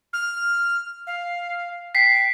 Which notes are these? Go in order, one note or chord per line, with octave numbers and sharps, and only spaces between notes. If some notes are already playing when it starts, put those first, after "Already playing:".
F6
F5
G5 B6 C7